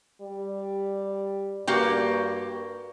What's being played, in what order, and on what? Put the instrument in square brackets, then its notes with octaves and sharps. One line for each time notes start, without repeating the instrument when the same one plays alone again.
[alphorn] G3
[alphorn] G2 [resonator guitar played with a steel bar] A#3 F#4 G4